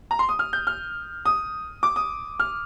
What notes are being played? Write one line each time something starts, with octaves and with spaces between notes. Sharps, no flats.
A#5
C6
D#6
F6
G6
F6
D#6
D6
D#6
F6